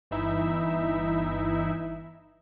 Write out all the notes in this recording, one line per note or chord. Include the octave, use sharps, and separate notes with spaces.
G1 E3 D#4 E4 E5